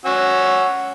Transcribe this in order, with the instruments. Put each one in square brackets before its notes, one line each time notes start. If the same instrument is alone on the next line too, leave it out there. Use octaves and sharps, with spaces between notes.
[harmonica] C#4 F#4 E6